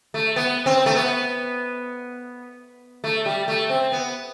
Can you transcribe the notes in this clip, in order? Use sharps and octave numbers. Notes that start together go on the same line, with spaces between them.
A3
B3
C4
A3
B3
A3
G3
A3
C4
B3